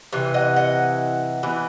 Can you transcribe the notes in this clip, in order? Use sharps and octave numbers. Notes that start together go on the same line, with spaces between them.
C3 E3
D#5 F#5
D#5 F#5
E3 B3